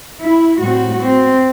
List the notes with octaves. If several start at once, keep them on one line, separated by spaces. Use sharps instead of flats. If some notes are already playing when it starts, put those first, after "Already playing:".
E4
A2 G3 C4 F#4
C4